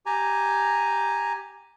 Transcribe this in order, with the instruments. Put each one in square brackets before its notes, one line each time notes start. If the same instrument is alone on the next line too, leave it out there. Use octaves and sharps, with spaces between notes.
[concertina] G4 G#5 A#5